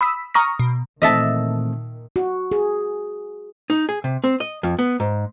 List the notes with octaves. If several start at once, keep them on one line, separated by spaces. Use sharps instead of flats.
B5 D#6 E6 B6
A#5 C#6 D#6 F6 A#6
B2
A#2 D#3 E3 A3 C4 D#5 E5 A5
F#4
G#4
D#4
G#4
C3
C4
D#5
F2
B3
G#2